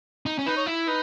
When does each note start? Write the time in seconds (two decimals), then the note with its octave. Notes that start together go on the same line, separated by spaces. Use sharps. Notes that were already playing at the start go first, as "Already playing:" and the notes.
0.26 D#4
0.39 C#4
0.46 D#4 B4
0.57 C#5
0.66 E4
0.87 D#4 B4